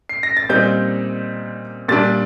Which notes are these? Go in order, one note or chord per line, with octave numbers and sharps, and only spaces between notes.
C7
A#6
A6
A#2 G3 C4 D#4 G6
A#2 G3 D4 A6